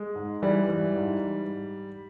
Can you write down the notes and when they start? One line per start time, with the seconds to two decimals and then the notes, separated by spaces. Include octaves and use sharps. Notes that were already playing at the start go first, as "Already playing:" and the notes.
Already playing: G#3
0.15 G#2
0.42 E3 G3
0.69 E3
0.96 G#2